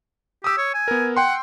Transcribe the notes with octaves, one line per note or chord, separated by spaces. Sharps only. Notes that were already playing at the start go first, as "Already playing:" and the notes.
G4 D#6 E6
C#5
G#5
B3 A#4
F#5 G5 C6